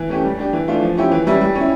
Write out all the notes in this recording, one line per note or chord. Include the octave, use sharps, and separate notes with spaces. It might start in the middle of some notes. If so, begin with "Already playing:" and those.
Already playing: E3
A3 C#4 G4
G3
D4 G4
E3
A3 D4 F4
F3
C#4 E4 G4
E3
G3 C#4 E4
G3
C#4
E4